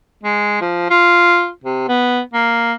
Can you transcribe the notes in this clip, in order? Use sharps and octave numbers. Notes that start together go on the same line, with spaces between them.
G#3
F3
F4
C3
B3
A#3